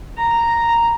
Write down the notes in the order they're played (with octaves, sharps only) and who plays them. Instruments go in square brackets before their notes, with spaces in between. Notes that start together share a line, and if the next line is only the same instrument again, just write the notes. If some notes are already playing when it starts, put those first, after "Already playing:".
[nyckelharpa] A#5